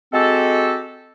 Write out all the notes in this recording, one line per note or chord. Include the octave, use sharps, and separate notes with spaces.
G#3 C4 F#4 G4 A4